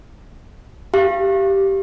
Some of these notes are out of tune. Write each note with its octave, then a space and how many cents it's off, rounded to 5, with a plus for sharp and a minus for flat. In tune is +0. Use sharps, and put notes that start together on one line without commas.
G4 -10 F5 -30